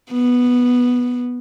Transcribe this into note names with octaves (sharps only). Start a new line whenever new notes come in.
B3